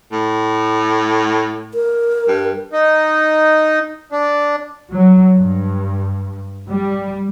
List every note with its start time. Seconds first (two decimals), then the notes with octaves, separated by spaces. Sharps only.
0.12 A2
1.74 A#4
2.28 G2
2.73 D#4
4.12 D4
4.91 F#3
5.37 G2
6.69 G3